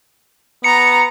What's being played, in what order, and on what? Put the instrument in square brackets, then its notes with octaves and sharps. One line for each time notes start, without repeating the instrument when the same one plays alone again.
[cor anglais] B3 [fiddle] A#5 [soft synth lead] C#7